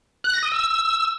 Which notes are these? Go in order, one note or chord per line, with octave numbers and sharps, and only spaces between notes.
F#6
A#6
D#6
E6